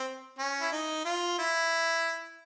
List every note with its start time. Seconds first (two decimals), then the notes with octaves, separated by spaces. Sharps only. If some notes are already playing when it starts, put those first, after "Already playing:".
Already playing: C4
0.39 C#4
0.61 E4
0.72 D#4
1.05 F4
1.39 E4